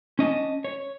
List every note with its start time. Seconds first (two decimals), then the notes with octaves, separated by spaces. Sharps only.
0.19 C#4 D#5 A5
0.64 C#5